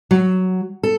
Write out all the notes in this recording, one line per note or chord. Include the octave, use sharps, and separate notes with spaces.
F#3
A4